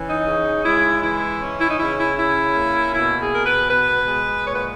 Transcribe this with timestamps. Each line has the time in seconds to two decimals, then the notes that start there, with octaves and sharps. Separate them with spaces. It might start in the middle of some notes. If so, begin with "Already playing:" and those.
Already playing: E3 C#4
0.09 D#4
0.27 C#3
0.65 G#3 E4
1.03 E3 E4
1.41 C#4
1.61 E4
1.70 D#4
1.79 C#3 E4
1.98 E4
2.18 C#4 E4
2.55 A#3
2.94 B2 E4
3.19 G#4
3.31 B2 A#4
3.44 B4
3.70 B3 B4
4.07 G#3
4.46 A#2 C#5
4.55 B4